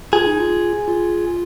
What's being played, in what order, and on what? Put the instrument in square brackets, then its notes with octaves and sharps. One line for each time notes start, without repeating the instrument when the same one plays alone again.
[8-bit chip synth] F4 [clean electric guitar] G#4
[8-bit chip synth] D#4
F4
F4